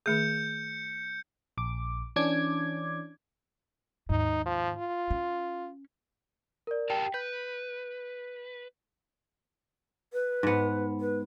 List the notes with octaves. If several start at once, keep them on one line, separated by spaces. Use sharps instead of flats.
D#3 A3 G#4 G6 C#7
A#1 D6
E3 C#4 D4 D6 G#6
D#2 G#2 D#4
F3
F4
C#4
A#4 D5
G4 A#4 G5 A5
B4 G6
B4
G#2 B3
B4